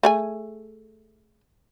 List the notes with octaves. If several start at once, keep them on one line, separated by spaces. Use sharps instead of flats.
A3 G#4 G#5